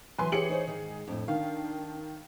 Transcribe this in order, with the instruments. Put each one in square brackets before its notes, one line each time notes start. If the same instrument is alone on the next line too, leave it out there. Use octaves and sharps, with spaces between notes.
[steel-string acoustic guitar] D3 F#3 [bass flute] E3 [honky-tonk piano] B4 G#5 C6
[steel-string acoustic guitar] G4 C#5 [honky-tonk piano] G#4 C#7 F#7
[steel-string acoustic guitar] D#4 C5 C#5
G#2 D#3
[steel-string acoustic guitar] F2 A2 [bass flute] D4
[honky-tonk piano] D#3 [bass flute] D4 [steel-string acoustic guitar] F5